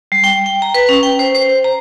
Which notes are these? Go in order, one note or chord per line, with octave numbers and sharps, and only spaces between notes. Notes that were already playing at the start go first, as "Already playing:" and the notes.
G3
G5
G5
A#5
B4
C#4
G5
C5
C5
A#5